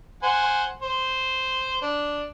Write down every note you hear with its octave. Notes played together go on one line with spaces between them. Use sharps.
C5 F#5 G#5
C5
D4